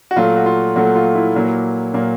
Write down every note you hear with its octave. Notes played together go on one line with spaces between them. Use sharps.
F#4
A#2 F#3 A3 F4
F#4
F4
A#2 F#3 A3 F#4
F4
E4
A#2 F#3 A#3
A#2 F#3 A#3